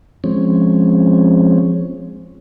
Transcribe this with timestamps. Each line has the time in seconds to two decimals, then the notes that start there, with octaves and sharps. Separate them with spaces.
0.24 F3 G#3 C4 C#4